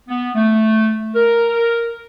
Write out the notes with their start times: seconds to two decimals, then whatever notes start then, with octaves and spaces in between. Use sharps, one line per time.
0.08 B3
0.34 A3
1.15 A#4